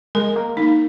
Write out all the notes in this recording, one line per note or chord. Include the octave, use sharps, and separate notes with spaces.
G#3 A#4
A#3
A#3 D#4